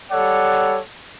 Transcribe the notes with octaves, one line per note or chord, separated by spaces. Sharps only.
G3 A4 C#5 D5 F#5